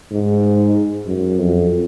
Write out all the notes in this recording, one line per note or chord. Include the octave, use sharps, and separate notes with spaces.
G#2
F#2
F2